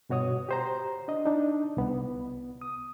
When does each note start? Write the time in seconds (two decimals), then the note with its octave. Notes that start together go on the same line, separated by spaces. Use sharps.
0.09 G2 B2 F#4 C#5 D#6
0.49 G4 C5 A#5
1.08 D4 D#5
1.26 D4 D#4
1.77 C2 B3
2.62 D#6